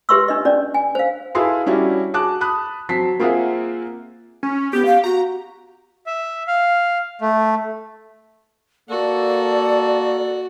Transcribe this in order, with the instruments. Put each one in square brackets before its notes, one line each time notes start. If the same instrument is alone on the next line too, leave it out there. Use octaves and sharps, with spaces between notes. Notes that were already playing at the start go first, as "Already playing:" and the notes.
[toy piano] G4 B4 E5 C6 C#6 E6
D4 D#5
C#4 D4 D5
G#5
C5 F5
[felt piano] E4 G#4 A4 B4 F5 C6
G3 C#4 D4 E4 F#4 G4
F#4 G#4 A5 D6 F#6
A5 B5 D#6 F#6
F#3 C4 A5 B6 C7
A#3 C4 F4 G#4 E5 F#5
[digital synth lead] C#4
[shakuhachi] B3 [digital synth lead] G4
[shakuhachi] F5
[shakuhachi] F#4 [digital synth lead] A#5
[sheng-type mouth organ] E5
F5
A3
[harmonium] A#3 A4 [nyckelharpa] F#4 [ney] D5